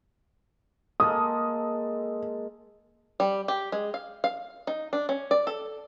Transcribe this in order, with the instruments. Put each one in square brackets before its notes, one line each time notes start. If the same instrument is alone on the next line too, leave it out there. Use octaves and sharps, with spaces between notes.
[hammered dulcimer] G#3 A#3 A4 [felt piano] D#6
[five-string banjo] G3
G4
G#3
F5
F5
D#4
D4
C#4
D5
A4